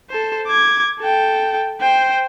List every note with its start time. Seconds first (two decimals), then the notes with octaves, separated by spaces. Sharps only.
0.10 A4 C5
0.47 D6 G#6
1.00 A4 G5
1.81 C5 G5